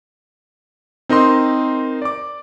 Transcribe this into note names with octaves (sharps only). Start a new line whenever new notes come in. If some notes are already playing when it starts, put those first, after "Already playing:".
C4 D#4 A#4 D#5 C6
D5 D6